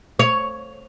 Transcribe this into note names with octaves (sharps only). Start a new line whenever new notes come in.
C#5